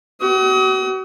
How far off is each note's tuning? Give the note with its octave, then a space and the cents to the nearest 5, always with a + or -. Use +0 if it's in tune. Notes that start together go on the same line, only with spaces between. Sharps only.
F#4 +40 D#6 +40